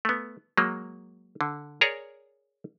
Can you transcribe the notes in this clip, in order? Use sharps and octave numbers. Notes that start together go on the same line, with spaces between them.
A3 B3
F#3 G#3 A#3
D3
G#4 A#4 C#5 D5 A#5